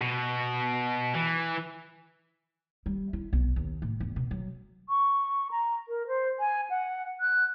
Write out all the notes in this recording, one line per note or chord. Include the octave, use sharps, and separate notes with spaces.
B2
E3
G3
E4
B1
D#2
A2
E2
B2
F#3
C#6
A#5
A#4
C5
G#5
F#5
F#6